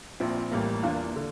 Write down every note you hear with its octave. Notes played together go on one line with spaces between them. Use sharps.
A#1 A#2 F3 C4 E4
A1 A2 E3 G3 A#3
E2 E3 A#3 D4 F4
D3